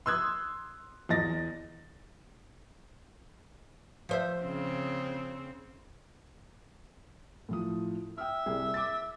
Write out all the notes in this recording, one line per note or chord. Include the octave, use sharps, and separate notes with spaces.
C6 D#6 E6 F#6 G#6
E2 D#5 A6 A#6
F3 C5 E5
C#3 C4
A2 F3 D#6
E5 G5 D#6 F6
C2 G3 G#4
D6 A6